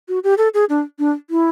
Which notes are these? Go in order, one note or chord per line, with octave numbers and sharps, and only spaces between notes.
F#4
G4
A4
G#4
D4
D4
E4